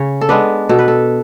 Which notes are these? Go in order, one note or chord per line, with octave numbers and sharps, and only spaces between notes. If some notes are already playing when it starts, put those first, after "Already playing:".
Already playing: C#3 C#5
A4
G#3 B3 D4 B4
B2 A4
B4
A4